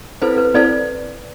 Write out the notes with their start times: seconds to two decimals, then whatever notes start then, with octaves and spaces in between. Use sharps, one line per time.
0.22 C4 E4 A4 B4 C5
0.38 B4
0.54 C4 E4 A4 C5 D5